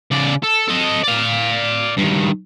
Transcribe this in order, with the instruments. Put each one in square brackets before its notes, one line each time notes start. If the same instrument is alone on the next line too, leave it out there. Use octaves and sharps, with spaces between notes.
[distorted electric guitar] C#3 D5
A4
A4 D#5
D5 F5
G2 D#3